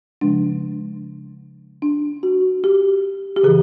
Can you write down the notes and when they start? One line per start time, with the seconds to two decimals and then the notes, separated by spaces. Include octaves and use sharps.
0.21 C#3 F3 G#3 D4
1.82 D4
2.23 F#4
2.64 G4
3.36 G4
3.43 C#3 E3 G#4